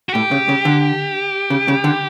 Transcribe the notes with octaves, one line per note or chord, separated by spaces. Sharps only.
F#4
A2 G4
C#3
C#3
D3
C#3
C#3
D3